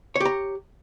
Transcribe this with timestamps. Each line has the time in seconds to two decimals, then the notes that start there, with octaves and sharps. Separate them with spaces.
0.16 C#5
0.20 G4
0.25 A#5